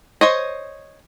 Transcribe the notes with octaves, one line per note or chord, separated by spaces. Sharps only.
C5 C#5 D#5